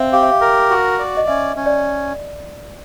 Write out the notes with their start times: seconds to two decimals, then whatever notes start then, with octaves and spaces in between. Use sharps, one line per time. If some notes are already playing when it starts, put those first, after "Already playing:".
Already playing: C4 E5 F5
0.13 G4 F5
0.23 E5
0.32 F5
0.41 A#4
0.70 F#4
0.99 D5
1.17 D#5
1.27 C#4 E5
1.56 C#4
1.66 D5